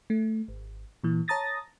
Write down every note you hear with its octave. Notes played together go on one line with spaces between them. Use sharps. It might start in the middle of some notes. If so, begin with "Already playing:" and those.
A3
G#1
A#2 E3
C#5 A5 A#5 D#6 A6 A#6